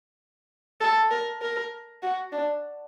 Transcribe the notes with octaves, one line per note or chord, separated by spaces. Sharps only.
A4
A#4
A#4
F#4
D4